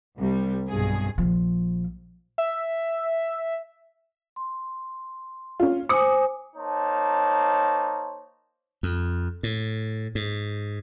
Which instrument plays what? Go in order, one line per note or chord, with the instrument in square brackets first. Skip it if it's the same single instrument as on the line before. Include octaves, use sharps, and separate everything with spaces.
[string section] C2 G3
B1 G2 B2 G#4
[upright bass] A#1 F3
[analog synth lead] E5
[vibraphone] C6
[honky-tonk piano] C#4 F4
[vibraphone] C5 G#5 [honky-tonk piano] D6 D#6 C#7
[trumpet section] A#3 D#4 C5 C#5 A5
[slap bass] F2
A2
G#2